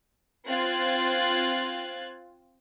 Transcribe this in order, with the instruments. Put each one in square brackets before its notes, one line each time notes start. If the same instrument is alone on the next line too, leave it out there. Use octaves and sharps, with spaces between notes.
[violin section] C4 F4 F#6 G#6 A6